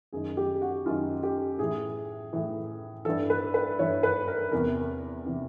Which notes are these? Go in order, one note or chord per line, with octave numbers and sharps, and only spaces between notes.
F#2 D#3 G#4
G4
F#4
F#2 D#3 F4
G4
A2 E3 G#4
A2 E3
G2 E3 A4
B4
B4
G2 E3 C#5
B4
A#4
E2 C3 E3 A#4
C3 E3